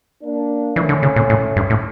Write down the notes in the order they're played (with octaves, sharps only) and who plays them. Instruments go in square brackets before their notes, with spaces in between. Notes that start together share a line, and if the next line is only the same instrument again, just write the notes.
[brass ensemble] A#3 D4
[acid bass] E3 [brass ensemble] A3 C#4
[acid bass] D3
C#3
A#2
A2
G2
A2